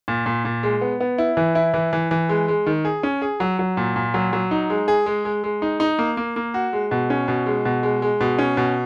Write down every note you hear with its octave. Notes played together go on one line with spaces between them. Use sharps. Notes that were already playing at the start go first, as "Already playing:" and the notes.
A#2
A#2
A#2
G#3
B3
B3
E4
E3
E4
E3
E3
E3
G#3
G#3
D#3
G#4
C#4
G#4
F#3
F#3
A#2
A#2
F#3
F#3
D#4
G#3
G#4
G#3
G#3
G#3
D#4
D#4
A#3
A#3
A#3
F#4
G#3
B2
C#4
B2
G#3
B2
G#3
G#3
B2
C#4
B2